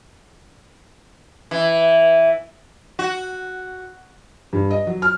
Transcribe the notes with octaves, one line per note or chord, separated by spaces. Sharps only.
E3
F#4
G2
D#5
F#3
F6